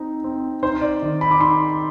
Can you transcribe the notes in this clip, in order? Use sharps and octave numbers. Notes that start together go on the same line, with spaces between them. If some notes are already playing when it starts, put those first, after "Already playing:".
Already playing: C4 D#4
C4
D#4 C5
D5
D#3
B5
D6
D#4 C6